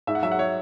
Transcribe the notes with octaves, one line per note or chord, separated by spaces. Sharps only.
G#2 E5
F#5
F#3 E5
F#5
C#5